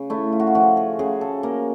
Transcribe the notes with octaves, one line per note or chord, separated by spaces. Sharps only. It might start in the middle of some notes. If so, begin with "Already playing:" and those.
Already playing: C#3
A3 E4
F4
F#4
F4
F3 F#4
G#4
C#3 G#4
A4
A#3 A#4